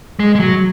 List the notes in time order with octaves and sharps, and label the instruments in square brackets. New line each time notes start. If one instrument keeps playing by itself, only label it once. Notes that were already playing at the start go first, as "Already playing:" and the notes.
[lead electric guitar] G#3
G#3
F#3